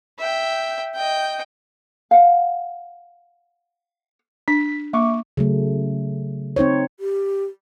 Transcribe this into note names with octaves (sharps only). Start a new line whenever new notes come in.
E5 G5
D#5 G5
F5 F#5
D4 B6
A#3 E5 C#6 D6
C#3 F#3 A3
C4 D#4 C5 C#5
G4